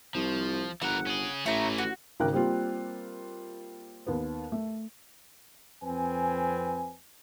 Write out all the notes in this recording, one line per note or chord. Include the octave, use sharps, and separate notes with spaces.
C2 F3
G1 E3 A#4 F#5
C#4 G#4
A1 E3 A3 C#4 A#5
F#4
G#1 C#3 A#4 G5 F#6
G3 A#3 C4 F4
D#2 B3
A3
F2 C4 B4 G#5